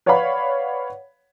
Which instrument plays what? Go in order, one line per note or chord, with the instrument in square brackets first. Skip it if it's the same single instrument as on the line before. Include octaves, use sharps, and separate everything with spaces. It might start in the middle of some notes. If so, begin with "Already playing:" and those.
[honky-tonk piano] B4 C#5 D5 F5 F#5 B5